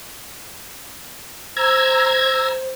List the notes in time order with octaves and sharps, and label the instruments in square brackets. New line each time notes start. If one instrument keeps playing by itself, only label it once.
[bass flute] C5 [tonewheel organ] A#5 E6 G#6